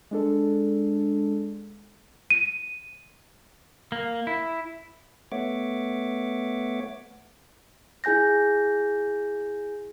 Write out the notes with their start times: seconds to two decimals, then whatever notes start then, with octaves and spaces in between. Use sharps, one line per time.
0.11 G#3 D4 A4
2.30 D#7
3.92 A#3
4.27 E4
5.32 A3 B3 C#5 E5 F#5 D6
8.04 E4 G#4 G#5 G6 A#6